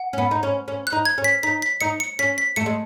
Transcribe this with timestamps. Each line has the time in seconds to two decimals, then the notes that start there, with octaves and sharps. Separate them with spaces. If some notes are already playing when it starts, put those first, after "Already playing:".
Already playing: F#5
0.13 C#4
0.18 B3
0.31 D#4
0.43 C#4
0.68 C#4
0.87 F#6
0.92 D#4
1.05 G#6
1.18 C#4
1.24 B6
1.43 D#4 B6
1.62 B6
1.81 D#4 C#7
2.00 C#7
2.19 C#4 B6
2.38 B6
2.56 A3 C#7
2.66 G#3